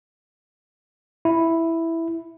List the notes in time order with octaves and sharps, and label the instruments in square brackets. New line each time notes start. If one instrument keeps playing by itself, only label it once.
[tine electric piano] E4